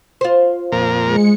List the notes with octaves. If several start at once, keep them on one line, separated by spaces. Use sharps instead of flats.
F4 C5
F2 A#2 A#4
G#3 C#7